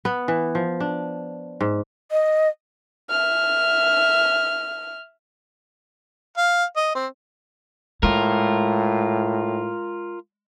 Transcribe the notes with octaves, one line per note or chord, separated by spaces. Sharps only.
B3
E3
F3
D4
G#2
D#5
E5 F6
F5
D#5
C4
A2 G#3 F4 A#4